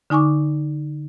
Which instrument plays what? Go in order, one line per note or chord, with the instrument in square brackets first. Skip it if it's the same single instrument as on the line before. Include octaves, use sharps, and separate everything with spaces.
[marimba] D3 D#4 G#5 C#6 D6